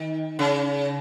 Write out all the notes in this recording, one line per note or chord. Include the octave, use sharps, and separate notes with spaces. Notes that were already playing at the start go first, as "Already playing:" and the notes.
Already playing: D#3
C#3